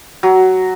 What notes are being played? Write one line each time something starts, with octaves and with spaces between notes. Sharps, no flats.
F#3